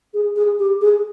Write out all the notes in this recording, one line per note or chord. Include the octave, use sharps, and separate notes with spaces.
G#4
G#4
G4
G#4